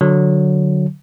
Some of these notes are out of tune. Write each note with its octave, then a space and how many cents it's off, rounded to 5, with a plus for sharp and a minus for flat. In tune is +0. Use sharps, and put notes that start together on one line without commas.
D3 +0 F#3 -5